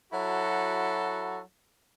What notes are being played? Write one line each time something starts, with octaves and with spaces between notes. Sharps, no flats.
F#3 E4 F#4 A4